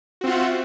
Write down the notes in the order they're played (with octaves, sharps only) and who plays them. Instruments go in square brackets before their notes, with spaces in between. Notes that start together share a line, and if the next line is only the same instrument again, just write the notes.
[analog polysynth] F#4
C4
F4
F#5
E5